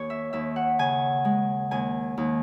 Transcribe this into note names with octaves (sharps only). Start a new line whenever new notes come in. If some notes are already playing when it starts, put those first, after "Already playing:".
Already playing: D#2 C#5
E5
D#2 E5
F#5
C#3 G#5
G#3
D#2 G#5
D#2